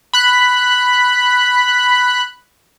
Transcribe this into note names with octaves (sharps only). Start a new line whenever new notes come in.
B5 F#6